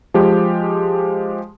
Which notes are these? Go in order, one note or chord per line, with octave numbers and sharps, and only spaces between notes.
F3 G#3 G4